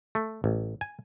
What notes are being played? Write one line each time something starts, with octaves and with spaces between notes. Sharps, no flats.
A3
A1
G#5